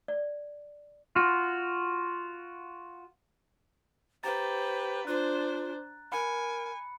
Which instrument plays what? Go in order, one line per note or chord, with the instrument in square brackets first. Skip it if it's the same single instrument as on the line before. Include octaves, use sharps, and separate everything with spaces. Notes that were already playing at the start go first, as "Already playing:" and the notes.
[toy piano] D5
[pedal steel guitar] F4 F#4
[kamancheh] G4 B4 [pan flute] C5 [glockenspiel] A#5 A6
[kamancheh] D4 C5 [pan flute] F4 [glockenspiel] F#6
[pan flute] A#4 [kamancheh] G#5 [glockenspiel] B5 C#7